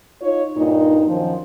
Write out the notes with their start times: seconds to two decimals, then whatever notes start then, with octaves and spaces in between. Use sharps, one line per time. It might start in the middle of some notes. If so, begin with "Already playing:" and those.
0.22 D#4 F4 C#5
0.56 G2 A#2 D#4
1.07 F#2 D#3 F3